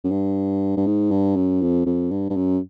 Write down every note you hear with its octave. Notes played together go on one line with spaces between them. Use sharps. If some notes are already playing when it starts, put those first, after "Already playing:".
F#2
G2
G2
G#2
G2
F#2
F2
F2
G2
G2
F#2